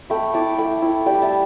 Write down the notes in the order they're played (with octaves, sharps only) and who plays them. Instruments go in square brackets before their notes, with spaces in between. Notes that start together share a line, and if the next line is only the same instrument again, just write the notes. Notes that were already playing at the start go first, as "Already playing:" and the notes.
[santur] A3 G5 B5
E4 A5 D6
A3 G5 B5
E4
G3 G5 B5
E5 A5